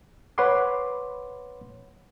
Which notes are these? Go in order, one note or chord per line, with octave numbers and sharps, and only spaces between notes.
B4 C#5 F#5 B5 C6 D6